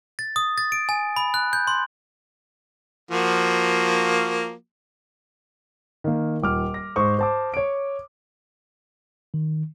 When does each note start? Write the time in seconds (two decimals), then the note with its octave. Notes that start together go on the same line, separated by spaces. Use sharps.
0.19 A6
0.36 D#6
0.58 A6
0.72 D7
0.89 G#5
1.16 B5
1.34 F#6
1.53 G6
1.67 C6
3.11 F3 A#3 F#4
6.04 D#3 A#3
6.42 D#1 D6 F6
6.74 A#6
6.96 G#2 C5 C#6 D#6
7.19 C5 A5 D6
7.54 C#5 D7
9.34 D#3